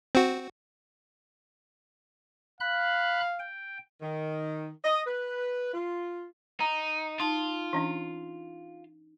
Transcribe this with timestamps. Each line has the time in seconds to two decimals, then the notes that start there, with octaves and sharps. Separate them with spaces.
0.15 C4 F#4
2.60 F5 B5 F#6
3.40 G5
4.02 D#3
4.85 D#5
5.06 B4
5.74 F4
6.60 D#4 A#5
7.20 D#4 F4 A5 C6
7.73 E3 C#4 D4